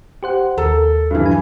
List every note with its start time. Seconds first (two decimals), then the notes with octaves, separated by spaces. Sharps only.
0.23 G4 C5 F#5
0.58 D#2 A4 A#4
1.11 G2 E3
1.26 F#3 G#5